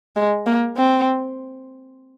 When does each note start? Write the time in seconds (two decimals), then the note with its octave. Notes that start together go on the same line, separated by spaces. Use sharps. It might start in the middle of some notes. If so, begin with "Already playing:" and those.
0.16 G#3
0.46 A#3
0.77 C4